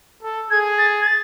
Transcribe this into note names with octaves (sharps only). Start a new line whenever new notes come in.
A4
G#4 G#6
A6
G#6
A6